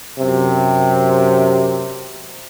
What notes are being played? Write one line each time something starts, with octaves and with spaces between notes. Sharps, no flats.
F#2 C3